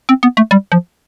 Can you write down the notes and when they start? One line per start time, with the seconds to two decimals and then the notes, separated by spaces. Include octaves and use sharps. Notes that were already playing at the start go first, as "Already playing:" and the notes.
0.09 C4
0.23 B3
0.37 A3
0.51 G3
0.72 F3